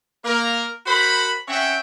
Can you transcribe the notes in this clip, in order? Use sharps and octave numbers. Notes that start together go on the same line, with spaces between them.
A#3 A#4
F#4 A#4 C5 B5
C4 C#4 C#5 E5 F#5 G5